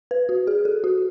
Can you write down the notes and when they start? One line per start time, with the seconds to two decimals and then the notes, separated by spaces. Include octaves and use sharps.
0.11 B4
0.29 F#4
0.47 G#4
0.65 A4
0.84 F#4